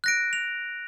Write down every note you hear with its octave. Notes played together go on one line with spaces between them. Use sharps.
F#6 A#6 D7
F7